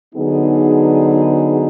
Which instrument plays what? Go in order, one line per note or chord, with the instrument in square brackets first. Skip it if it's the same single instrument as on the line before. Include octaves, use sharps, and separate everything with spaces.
[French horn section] D3 F#3 B3 D#4 G#4